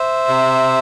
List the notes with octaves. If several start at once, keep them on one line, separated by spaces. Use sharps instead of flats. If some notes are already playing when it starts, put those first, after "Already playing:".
Already playing: C5 E5
C3